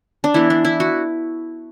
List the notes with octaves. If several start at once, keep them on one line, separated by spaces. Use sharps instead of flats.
D4
E3 B3 E4
D4
E4
F#4